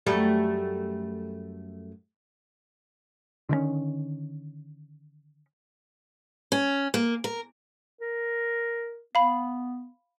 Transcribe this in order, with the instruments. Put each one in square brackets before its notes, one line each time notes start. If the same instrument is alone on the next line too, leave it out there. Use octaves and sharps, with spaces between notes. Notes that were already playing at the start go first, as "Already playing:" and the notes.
[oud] F#2 G3 A3
[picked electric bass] D3 D#3 G#3 C#4
[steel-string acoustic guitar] C#4
A#3
A#4
[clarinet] A#4
[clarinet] B3 [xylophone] F5 B5